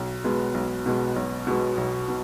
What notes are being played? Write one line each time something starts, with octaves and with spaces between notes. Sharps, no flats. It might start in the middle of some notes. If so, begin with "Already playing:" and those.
Already playing: B1
B2 G#3 B3
B1
B2 G#3 B3
B1
B2 G#3 B3
B1
B2